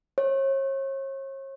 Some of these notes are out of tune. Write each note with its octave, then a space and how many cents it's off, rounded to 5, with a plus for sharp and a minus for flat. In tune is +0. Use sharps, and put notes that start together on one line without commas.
C#5 -40